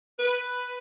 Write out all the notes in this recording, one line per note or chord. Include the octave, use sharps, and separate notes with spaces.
B4